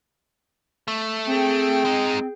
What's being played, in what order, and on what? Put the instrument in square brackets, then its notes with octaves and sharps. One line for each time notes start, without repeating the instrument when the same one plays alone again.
[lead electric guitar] A3
[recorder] C4 [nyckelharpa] G#4 G5
[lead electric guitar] G#3 D#4